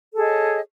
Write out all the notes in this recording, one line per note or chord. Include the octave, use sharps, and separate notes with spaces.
G#4 A4 C#5 D#5